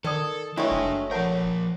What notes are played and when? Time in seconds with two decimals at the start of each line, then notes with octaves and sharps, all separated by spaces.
0.04 D#3 A4 A#4 D5 D#6
0.57 F#3 G#3 A3 D4 E4 G5
0.71 F#1
1.11 F3 A#4 C#5 F#5 A5